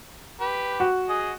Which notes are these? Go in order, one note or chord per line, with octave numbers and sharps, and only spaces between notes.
G4 B4
F#4
G#4 D#5